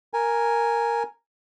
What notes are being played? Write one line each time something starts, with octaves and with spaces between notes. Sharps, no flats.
A#4 G#5